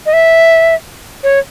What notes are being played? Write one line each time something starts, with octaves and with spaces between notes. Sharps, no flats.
D#5
E5
C#5